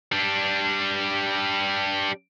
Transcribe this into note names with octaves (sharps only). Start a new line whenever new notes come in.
G3 D4